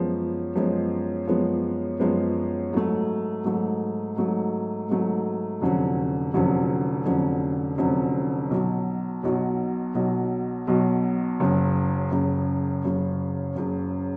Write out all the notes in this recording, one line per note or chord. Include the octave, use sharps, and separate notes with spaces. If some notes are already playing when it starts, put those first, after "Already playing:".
Already playing: F#2 F3 G#3 B3
F#2 F3 G#3 B3
F#2 F3 G#3 B3
F#2 F3 G#3 B3
G#2 F#3 A3
G#2 F#3 A3
G#2 F#3 A3
G#2 F#3 A3
F1 F2 D3 F#3 C#4
F1 F2 D3 F#3 C#4
F1 F2 D3 F#3 C#4
F1 F2 D3 F#3 C#4
B1 B2 F#3
B1 B2 F#3
B1 B2 F#3
B1 B2 F#3
F#1 F#2 C#3
F#1 F#2 C#3
F#1 F#2 C#3
F#1 F#2 C#3